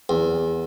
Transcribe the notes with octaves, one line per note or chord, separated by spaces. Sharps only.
E2